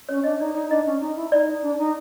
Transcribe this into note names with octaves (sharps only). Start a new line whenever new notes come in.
C#4 C#5
D4 D#5
D#4 D5
D#4 D5
D4 D#5
C#4
D#4
E4
D#4 D5
D4
D#4